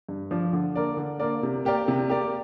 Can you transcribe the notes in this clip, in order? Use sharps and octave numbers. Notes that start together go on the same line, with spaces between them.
G2
F3 D4
D3
A#3 D4 A#4 D5
D3
A#3 D4 A#4 D5
C3
A#3 G4 A#4 D5
C3
A#3 G4 A#4 D5